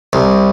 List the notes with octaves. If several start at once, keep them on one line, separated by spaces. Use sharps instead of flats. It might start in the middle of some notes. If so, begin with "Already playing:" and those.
C2